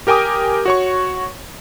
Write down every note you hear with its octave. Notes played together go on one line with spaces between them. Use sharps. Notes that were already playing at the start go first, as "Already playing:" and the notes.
G4 A#4 G5 G#5 D6 D#6
F#4 C#5 C#6